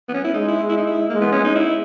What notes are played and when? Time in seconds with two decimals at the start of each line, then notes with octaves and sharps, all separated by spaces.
0.09 B3
0.14 C#4
0.24 E4
0.34 G#3 D#4
0.48 E4
0.69 E4
0.77 D#4
0.87 E4
1.10 A#3
1.15 G#3
1.21 B3
1.32 C#4
1.44 D#4
1.55 E4